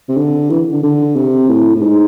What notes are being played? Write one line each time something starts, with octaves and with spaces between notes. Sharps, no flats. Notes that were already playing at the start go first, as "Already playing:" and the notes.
C3
D3
E3
D3
D3
C3
A2
A2
G#2